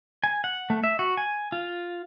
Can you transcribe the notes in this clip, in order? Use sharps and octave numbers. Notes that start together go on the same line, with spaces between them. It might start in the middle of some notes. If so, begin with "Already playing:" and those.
G#5
F#5
A3
E5
F#4
G#5
F4